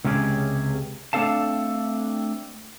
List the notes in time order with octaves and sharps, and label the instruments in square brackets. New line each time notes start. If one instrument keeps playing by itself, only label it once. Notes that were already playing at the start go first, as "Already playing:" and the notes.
[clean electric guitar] C#2 C3 G#3 C#4 G4 G#4
A3 C4 D4 A4 F5 A5